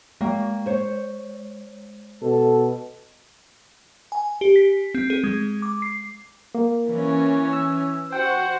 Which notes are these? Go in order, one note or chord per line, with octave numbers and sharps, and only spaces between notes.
G#3 A#3
C5 C#5
B2 A4
G#5
G4
B6
C4
G#4
G#3
D6
C7
A#3
E3 C#4
E6
F#4 C5 F#5 G5